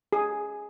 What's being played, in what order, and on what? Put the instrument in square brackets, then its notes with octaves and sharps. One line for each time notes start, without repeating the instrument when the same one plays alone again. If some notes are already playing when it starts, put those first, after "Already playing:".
[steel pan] G#4